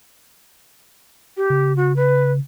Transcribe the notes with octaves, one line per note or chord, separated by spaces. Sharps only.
G4
C#3
F#4
B4